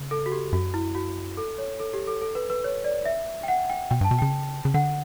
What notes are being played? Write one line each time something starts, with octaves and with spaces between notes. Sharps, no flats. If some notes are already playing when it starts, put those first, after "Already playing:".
Already playing: C#3
A4
F#4
G4
F#2 F#4
E4
F#4
A4
C#5
A4
G4
A4
A4
B4
B4
C#5
D5
E5
G5
F#5
G5
B2 G5
G2 A5
B2
C#3 G5
C#3
D3 F#5